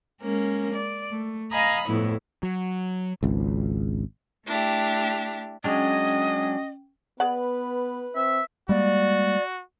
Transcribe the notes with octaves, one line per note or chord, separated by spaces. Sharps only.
G#3 A#3 C#4
D5
A3
D#5 F5 G#5 A#5 B5 D#6
F2 A2 B3 E4
F#3
G#1 C#2
A3 D4 E4 G4
F#3 G#3 C#4 D4 D#5 G5
B3 G#4 B4 D5 F#5
C4 E5
G3 G#3 A#3 F#4 D5